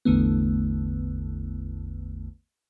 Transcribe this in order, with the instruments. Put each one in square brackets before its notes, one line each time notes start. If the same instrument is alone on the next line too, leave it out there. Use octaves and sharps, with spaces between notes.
[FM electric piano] A1 E2 D3 A3 B3